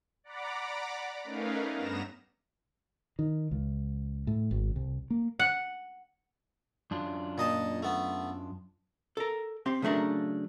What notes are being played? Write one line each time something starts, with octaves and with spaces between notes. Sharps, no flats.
D5 F#5 A#5 B5 D6
A3 C#4 D#4 A#4 B4 F5
G2 B3 A#5 A#6 E7
D#3
C#2
A2
G#1
C2
A#3
F#5
F#2 D4 F4
A#2 D#5 A5
A3 B3
A4 A#4
C4 G4 C6
C#3 F#3 A3 D4 A#4